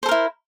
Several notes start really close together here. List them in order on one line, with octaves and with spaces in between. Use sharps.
C5 A4 A#4 E4